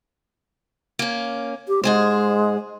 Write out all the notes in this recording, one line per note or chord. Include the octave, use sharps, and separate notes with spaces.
A#3 C#4
G4
G#2 G#3 G#4 C5